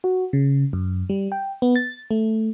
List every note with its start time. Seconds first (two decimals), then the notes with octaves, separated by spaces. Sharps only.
0.04 F#4
0.33 C#3
0.73 F#2
1.09 G3
1.32 G5
1.62 B3
1.76 A6
2.11 A3